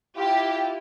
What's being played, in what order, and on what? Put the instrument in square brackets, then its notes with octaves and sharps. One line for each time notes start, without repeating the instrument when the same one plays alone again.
[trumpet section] E4 F4 [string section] G4